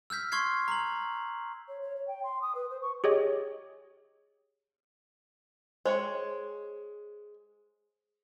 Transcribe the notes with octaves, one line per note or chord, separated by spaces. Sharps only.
E6 F6 G6 B6
C6 C#6 F6 G#6 C7
A#5 F#7
C#5
C#5
C#5
G5
C6
D#6
B4
C5
C#6
G4 G#4 C#5 D#5
G#3 C5 C#5 G5